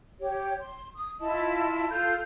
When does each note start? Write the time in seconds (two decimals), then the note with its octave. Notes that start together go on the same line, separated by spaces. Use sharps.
0.20 G4 C#5
0.61 C6
0.96 D#6
1.20 E4 F4 D#5 A5
1.90 F4 A4 G6